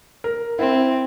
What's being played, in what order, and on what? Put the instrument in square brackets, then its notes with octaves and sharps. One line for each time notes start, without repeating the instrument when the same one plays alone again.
[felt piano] A#4
[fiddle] C4 [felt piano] E4